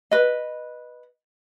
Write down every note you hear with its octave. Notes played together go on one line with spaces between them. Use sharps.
B4 D#5